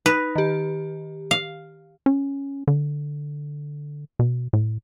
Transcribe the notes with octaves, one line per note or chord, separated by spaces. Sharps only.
D#4 B4
D#3 G4
F5
C#4
D3
B2
A2